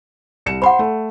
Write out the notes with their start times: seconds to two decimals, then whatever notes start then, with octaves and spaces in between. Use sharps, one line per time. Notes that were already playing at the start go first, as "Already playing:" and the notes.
0.46 C2 C#7 E7
0.62 C5 F#5 B5 C6
0.79 A3